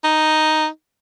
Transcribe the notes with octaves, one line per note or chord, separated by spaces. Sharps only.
D#4